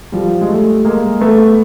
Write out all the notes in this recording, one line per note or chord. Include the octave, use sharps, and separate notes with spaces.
F3 G3
G#3
G3 A3
G#3 A#3
A3 B3